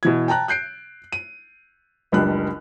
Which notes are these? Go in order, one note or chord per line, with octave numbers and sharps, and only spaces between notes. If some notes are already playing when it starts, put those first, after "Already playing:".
B2 E3 G#6
G5 A5 A#5 F#6
F#6 G6 C7 D7
D#7
F#1 C#2 G3 D4 F#6